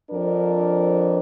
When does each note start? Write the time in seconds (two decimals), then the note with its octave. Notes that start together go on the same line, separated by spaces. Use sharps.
0.11 F2 F3 D4 A#4